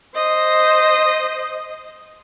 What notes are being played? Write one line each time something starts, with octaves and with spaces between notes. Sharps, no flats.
C5 D#5